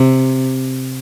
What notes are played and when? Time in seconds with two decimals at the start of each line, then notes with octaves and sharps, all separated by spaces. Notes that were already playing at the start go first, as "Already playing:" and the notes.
Already playing: C3